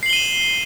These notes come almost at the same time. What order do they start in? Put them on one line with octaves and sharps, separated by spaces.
C7 F#7 G7 D#7 E7